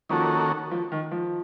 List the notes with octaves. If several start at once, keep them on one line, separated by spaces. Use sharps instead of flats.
D#3 F3 A#3 C#4 F#4 A4
F3
D#3
F3